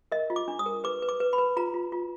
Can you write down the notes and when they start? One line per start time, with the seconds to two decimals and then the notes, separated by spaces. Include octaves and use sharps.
0.12 A#4 D#5
0.30 F4
0.36 D6
0.48 D4
0.59 D#6
0.66 A#4
0.84 B4 D6
1.02 B4
1.09 D6
1.20 B4
1.33 B5
1.38 B4
1.57 F4 A#5
1.74 F4
1.92 F4